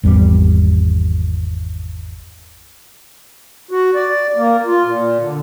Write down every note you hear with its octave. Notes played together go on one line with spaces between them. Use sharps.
G#1 E2 G3
F#4
D5
A#3
F4
A#2
D3